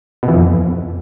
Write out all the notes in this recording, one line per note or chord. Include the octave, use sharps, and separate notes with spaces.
B2
E3
F2